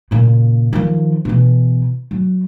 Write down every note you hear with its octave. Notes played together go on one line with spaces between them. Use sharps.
A#2 C#3
D#3 F3
B2 E3
F#3